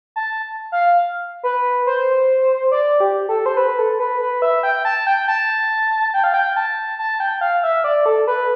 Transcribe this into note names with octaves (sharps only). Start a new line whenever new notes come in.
A5
F5
B4
C5
D5
G4
A4
C5
B4
A4
B4
B4
E5
G5
A5
G5
A5
G5
F5
G5
A5
A5
G5
F5
E5
D5
A4
B4